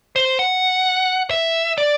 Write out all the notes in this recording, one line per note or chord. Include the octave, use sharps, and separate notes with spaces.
C5
F#5
E5
D5